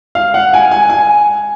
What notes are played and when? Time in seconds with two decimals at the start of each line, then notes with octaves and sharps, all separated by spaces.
0.15 F5
0.34 F#5
0.54 G#5
0.71 G#5
0.90 G#5